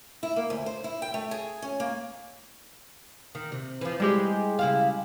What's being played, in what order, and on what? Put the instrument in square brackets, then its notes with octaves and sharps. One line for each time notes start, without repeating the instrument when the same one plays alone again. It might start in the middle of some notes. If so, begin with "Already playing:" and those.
[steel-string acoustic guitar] E4
A#3
D2
C5
E4
G5
A3
G#4
C#4
A#3
[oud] D#3
C3
E3 F3
[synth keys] G3 G#3 G4 [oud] E4
[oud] C#3 E4 F5